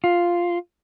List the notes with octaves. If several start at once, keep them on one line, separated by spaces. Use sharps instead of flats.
F4